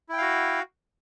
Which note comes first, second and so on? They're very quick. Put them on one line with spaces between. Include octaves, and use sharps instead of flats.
E4 G5 F5 F#4